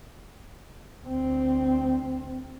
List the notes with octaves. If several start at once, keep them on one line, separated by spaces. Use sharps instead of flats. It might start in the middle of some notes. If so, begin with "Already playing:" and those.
D2 C4